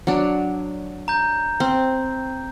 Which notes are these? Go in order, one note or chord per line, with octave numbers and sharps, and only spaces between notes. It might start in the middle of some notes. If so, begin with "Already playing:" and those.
F#3 D4
A#5 G6
C4